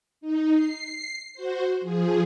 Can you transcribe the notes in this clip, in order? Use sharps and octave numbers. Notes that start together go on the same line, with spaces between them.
D#4
C7
F#4 C5
F3 G#4